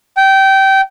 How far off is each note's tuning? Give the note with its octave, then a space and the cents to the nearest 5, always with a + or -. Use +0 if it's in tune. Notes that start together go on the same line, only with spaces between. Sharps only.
G5 -20